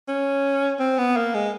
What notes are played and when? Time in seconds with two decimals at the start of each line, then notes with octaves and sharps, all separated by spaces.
0.08 C#4
0.79 C4
0.98 B3
1.17 A#3
1.34 G#3